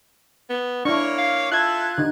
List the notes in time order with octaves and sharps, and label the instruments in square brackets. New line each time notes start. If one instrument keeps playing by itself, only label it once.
[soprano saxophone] B3
[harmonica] A#3 C#5 [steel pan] D4 E4 [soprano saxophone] C#6
[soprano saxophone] F5
[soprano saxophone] F4 [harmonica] A4 E5 [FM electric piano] F#6 G#6
[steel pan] D3 D#4